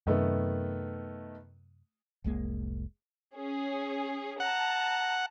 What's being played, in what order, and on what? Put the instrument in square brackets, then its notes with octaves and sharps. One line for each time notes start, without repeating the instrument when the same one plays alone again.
[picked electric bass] F#2 C3 [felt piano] D#3 A3 B3
[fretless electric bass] F1 C2 G#3 A#3
[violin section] C#4 G#4
[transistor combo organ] F#5 [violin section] A5 A#5